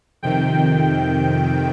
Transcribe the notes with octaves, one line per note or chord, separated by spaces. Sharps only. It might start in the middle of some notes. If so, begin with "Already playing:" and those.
F2 C3 D#3 G5